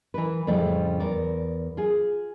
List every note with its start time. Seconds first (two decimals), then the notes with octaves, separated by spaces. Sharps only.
0.14 E3 A#4 B4
0.47 F2 A2 C#3 F3 G3 A3
1.00 E2 A#4 D5
1.77 F4 G#4